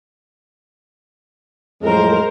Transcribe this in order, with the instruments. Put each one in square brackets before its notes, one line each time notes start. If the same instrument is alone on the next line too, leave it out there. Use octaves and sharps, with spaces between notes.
[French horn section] F2 A2 F#3 [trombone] G#3 [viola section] A#4 C5